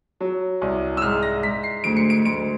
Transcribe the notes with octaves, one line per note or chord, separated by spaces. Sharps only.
F#3
C2
E6
G#2 F6
A#6
G#2 B6
C7
D2 D7
C#7
D7
D2 D7